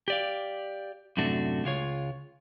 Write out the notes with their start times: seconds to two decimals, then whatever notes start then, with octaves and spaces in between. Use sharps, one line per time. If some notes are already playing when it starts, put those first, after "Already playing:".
0.08 G4 D5 F5
1.17 F#2 A2 C3 A3 D4 F#4
1.64 C#2 G#3 F4 C#5